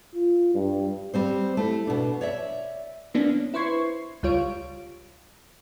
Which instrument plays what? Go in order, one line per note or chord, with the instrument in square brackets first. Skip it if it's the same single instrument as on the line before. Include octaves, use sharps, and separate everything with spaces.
[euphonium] F4
G2
[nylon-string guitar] G3 C4 C5
A3 E4
B2 D4
C#5 D5 E5
[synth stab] D3 A#3 B3 C#4 D4
E4 B4 C5 C#6 G#6 C7
C#2 G3 F4 C#5 D7